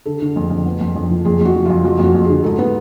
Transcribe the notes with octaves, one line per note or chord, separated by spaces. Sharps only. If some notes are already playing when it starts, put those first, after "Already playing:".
D3 A4
D3
F2
F2
B3
F2
F2
F3
F2 G#4
F2 F#4
F3
F2 F4
F2 F#4
F2 F#4
F2
G#4
D3
G#2 A4
B3